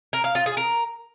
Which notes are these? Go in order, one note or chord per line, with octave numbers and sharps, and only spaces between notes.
A#4
F5
F4
G#4
A#4